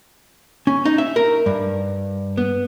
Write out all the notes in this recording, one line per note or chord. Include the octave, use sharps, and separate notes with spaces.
C#4
D#4
E5
A#4
G2
B3